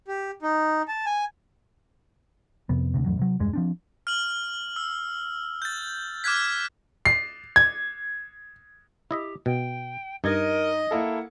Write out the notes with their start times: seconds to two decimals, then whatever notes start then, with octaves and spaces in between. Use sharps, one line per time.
0.08 G4
0.42 D#4
0.88 A5
1.06 G#5
2.69 F2 C3 B3
2.94 D2 C3
3.06 A1 F2 C#3 F#3
3.19 C3 F#3
3.40 E1 E2 G2 G#3
3.53 F3 C4 D4
4.07 F6 F#7
4.76 E6
5.62 G6 A6
6.24 D6 F6 F#6 G#6 B6
7.05 C7
7.56 G#6
9.11 E4 G4 D#5 E5
9.46 B2 G5
10.24 G2 D#4 A#4 D#5 G#6
10.91 A#3 E4 A4 F#5